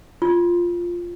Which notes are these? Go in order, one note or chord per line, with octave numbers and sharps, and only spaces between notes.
F4